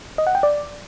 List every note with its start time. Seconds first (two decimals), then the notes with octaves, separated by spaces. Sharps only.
0.18 D#5
0.27 F#5
0.35 G5
0.43 D5